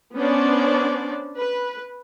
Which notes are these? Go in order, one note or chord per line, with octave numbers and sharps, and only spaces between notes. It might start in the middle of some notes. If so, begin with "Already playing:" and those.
B3 C#4 D4 C5 D5
B4